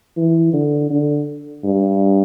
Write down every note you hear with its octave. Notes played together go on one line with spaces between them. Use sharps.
E3
D3
D3
G2